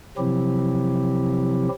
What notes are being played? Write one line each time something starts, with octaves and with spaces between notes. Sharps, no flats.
C3 F3 F#3 C4 E4 G4